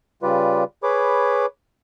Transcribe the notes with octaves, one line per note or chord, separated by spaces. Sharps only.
C#3 G3 F4 B4 D5
G#4 B4 C#5 B5 D6